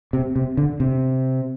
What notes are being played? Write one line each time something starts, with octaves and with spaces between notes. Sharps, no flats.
C3
C3
D3
C3